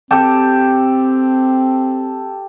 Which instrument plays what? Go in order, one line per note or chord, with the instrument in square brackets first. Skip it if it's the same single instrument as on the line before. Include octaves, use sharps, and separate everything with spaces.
[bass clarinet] C4 [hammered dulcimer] G4 A4